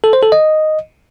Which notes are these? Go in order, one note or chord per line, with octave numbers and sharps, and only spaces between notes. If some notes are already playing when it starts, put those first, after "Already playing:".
A4
C5
A4
D#5